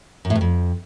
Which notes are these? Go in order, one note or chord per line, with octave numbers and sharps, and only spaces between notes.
F#2
A2
G2
F2